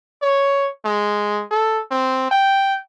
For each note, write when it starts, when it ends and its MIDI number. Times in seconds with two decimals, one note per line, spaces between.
0.22 0.69 73
0.85 1.44 56
1.51 1.81 69
1.91 2.31 60
2.31 2.76 79